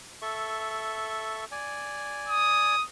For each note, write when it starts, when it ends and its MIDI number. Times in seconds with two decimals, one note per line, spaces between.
0.22 1.45 69
0.22 1.45 76
0.22 1.45 85
1.52 2.75 74
1.52 2.75 80
2.29 2.84 87